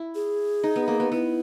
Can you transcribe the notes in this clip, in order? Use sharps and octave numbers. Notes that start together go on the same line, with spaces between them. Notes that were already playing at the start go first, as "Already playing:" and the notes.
Already playing: E4
G#4
D#4
B3
A#3
B3
B3 E4